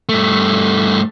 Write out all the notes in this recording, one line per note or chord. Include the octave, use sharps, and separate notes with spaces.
G2 A3